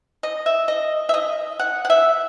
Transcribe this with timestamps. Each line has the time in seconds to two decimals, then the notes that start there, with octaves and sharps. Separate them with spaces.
0.23 D#5
0.46 E5
0.68 D#5
1.09 E5
1.14 D#5
1.59 F#5
1.85 F#5
1.90 E5